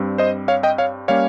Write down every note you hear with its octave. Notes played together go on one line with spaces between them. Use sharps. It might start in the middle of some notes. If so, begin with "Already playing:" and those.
Already playing: G2 G3 C4
C5 D#5
C#5 F5
D#5 G5
C#5 F5
G3 A#3 C#4 C#5 F5